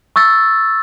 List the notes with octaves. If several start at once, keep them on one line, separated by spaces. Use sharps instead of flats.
C#6 E6 A6